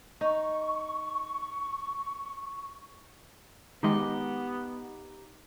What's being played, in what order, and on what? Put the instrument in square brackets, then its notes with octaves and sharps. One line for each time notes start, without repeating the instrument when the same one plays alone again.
[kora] D#4 [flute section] C#6
[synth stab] D#3 G#3 [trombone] B3 [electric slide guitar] D#4 G4 D#5